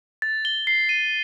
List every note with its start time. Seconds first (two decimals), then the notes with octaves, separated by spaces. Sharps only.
0.22 A6
0.45 G7
0.67 C7
0.89 D#7